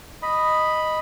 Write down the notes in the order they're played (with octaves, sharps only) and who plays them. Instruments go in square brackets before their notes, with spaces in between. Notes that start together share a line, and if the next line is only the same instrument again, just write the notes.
[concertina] D#5 B5